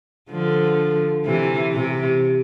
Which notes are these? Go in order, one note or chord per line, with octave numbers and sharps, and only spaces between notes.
D3 F3
C3 E3
C3